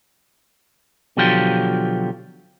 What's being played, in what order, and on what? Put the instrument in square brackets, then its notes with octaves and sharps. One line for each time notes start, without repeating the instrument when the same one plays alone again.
[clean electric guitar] B2 D3 F3 F#3 F4 G4